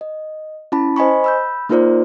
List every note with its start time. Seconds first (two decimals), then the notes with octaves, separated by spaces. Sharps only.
0.01 D#5
0.72 C#4 E4 A5 B5
0.96 C5 D#5 G#5 B5 C#6
1.24 B5 E6 G6
1.69 A#3 D#4 F4 A#4 C5 D5